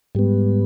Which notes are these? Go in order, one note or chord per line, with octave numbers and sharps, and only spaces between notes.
G#2 G3 B3